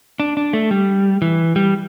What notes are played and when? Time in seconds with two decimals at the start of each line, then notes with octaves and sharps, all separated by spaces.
0.20 D4
0.37 D4
0.53 A3
0.71 G3
1.22 E3
1.56 G3